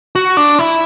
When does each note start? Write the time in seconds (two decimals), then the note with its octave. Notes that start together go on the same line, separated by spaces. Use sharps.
0.15 F#4
0.37 D4
0.59 E4